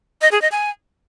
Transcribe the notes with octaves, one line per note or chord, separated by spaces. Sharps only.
D#5
G#4
D#5
G#5